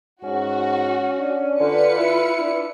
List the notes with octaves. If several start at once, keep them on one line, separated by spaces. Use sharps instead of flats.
G#2 C#4 F#4
D4
D3 F4 B4 C#7
E4
D4